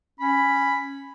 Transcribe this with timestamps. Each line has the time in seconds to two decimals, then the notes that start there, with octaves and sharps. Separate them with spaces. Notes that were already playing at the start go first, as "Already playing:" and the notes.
0.20 C#4 B5